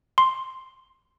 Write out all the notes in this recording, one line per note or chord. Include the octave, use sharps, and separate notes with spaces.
C6